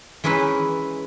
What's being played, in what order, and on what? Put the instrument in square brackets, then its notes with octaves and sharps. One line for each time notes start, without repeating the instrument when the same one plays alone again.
[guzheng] E3 G#3 C#4 D#4 E4 B4